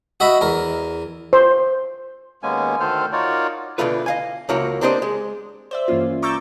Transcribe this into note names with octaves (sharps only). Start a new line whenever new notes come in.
F#4 D#5 E5 B5
E2 A#4
C5
D#2 G#3 A#3 B3 C#4 G#5
D2 D#3 A4 C5 F6
D#4 F4 F#4 A#4 C#5 D5
B2 D3 E3 A3 F4 B4
D#5 F5 G#5
C#2 F3 A#3 E4 F#4 C#5
A#3 C4 D4 G4 C5 D#5
G#3
C5 D5 E5
G2 E3 A#3 C#4 F4
A#5 C#6 D6 E6 G6 A6